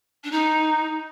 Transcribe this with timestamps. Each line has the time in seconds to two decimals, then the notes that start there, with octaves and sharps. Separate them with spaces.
0.24 D4
0.31 D#4